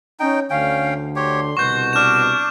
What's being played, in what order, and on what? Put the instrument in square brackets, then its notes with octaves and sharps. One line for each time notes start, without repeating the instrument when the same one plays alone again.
[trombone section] C#4 [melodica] D#4 G5
[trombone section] D2 D3 [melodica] C#4 G5 [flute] F5
[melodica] G4 C#5 [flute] C6
[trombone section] C2 B2 [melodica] F#4 [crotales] C#6 G6
[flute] D4 [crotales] F6 E7